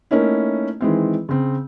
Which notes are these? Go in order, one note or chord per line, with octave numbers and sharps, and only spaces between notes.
A3 A#3 C#4 D#4 E4
D#3 E3 G#3 C4
C#3 C4